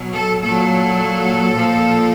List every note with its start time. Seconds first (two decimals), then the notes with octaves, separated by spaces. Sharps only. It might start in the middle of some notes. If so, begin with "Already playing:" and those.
Already playing: B2 F#3
0.14 A4
0.42 A#2 F#3 A4
1.55 A#2 F3